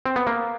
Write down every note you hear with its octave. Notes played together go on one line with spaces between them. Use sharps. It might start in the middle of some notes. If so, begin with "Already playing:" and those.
C4
B3
A#3